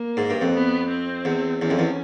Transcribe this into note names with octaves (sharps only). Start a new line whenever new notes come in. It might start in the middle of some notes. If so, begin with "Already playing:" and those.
Already playing: A#3
G#2
G2
F2
B3
C4
E2
E2 C#4
F2
E2